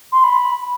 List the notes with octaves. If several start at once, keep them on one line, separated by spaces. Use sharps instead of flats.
C6
B5